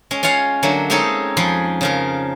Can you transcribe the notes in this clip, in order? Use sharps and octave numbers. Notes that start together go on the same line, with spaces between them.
G#3 C#4
C#4 F4 C#5 F5 F#5
D3 F#3 A3 A#3
G#3 C4 C#4 D#4 G#4 A4
F2 F3 F4 G#4 B5
C#3 F3 A#4